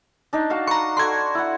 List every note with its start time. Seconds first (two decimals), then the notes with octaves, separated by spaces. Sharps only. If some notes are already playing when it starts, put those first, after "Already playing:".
0.33 D4 D#4
0.50 F#4 F5 A5
0.67 B4 A#5 C#6
0.97 F#4 A4 D5 C6 G#6
1.35 E4 F#5